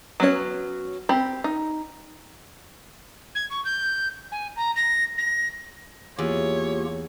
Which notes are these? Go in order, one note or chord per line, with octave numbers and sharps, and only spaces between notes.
F#3 B3 C#4 F#4 C#5
C4 G4 B5
D#4
G#6
C#6
G6
G#5
A#5
A#6
A#6
E2 A#3 F4 G4 C#5